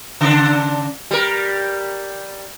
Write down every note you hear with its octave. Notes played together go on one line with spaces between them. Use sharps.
C#3 D4
G3 A#4